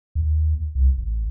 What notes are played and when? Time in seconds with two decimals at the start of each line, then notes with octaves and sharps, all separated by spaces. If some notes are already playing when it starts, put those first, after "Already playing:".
0.15 D#2
0.75 C2
0.98 A1